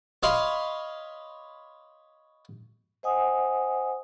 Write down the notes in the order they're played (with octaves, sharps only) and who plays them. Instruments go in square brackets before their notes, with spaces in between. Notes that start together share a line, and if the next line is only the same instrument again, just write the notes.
[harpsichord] C#5 D#5 F5 B5 C6
[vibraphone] C5 D#5 F#5 G#5 D#6